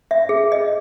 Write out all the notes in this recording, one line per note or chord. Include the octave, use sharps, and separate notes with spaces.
E5
G#4
D#5